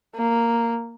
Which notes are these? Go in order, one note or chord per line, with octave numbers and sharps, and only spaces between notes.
A#3